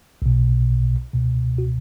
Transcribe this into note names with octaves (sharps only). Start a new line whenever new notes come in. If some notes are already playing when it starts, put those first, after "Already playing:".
B1 B2
C#2 B2
F#4